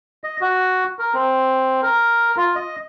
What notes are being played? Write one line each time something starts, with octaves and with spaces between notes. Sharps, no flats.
D#5
F#4
A#4
C4
A#4
F4
D#5